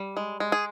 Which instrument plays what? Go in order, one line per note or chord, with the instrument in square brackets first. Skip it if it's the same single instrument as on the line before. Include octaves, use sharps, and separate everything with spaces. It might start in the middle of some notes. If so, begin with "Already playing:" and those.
Already playing: [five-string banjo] G3
G#3
G#3
G#4